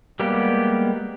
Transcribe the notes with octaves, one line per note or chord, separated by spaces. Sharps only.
G3 G#3 A#3 B3 G4